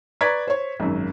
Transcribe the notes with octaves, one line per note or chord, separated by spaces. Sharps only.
B4 D5 A#5 C#6 G#6 B6
C5 C#5
G#1 F#2